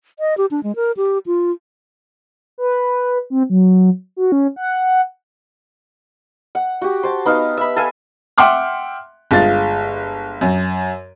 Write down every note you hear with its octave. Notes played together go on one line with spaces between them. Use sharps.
D#5
G4
D4
G#3
A#4
G4
F4
B4
C4
F#3
F#4
C#4
F#5
F#5
F#4 G4
C5 A5
B3 D#4 F5
E5 B5
A4 F5 G#5
E5 F#5 G5 C6 D6 F6
G1 G#3 F4 A6
F#2